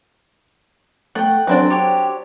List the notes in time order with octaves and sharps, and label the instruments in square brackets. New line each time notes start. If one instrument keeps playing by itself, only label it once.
[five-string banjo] A3 [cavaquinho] F#5 G5
[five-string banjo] F#3 C4 D4
[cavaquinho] G4 C#5